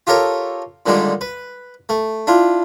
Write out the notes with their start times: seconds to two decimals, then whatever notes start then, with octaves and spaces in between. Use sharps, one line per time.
0.07 F4 G4 A4 A#4 C#5
0.86 A#2 D3 D#3 G3 G#3 G4
1.21 B4
1.89 A3
2.27 D4 E4 F4